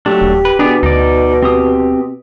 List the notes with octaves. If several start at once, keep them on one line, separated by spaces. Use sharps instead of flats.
F#3 A3 D4 G4
D#1
B4
B2 B3 D4 G4 G#4
D2 D#4 D5
C4 G4 D#6